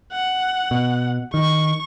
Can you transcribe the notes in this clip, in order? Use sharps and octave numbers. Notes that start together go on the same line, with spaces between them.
F#5
B2
D#3 C#6